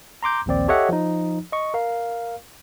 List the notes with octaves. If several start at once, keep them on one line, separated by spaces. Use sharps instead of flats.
A#5 C6 D6 G6
A#1 D#2 C4 D5
G4 A4 C#5 D#5 E5 F#5
F3 D#4
D#5 C#6
A#4 F5